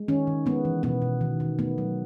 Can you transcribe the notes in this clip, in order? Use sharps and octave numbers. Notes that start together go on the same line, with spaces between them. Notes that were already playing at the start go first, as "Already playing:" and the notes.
Already playing: G#3
D#3 C#4
D#3
G#3 B3
E3
B2 B3
B2
D#3
D#3
A3 B3
F#3